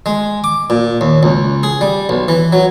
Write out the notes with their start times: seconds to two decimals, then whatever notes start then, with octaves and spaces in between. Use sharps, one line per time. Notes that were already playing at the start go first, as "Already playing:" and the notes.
0.06 G#3
0.44 D6
0.70 A#2
1.01 D#2
1.23 C#2
1.63 G#4
1.81 G3
2.09 B1
2.28 E3
2.53 F#3